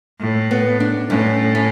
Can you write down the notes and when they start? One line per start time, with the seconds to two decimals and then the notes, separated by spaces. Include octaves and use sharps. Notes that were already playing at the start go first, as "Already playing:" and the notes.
0.20 A2
0.51 B3
0.80 D4
1.10 A2 C#4
1.55 C#4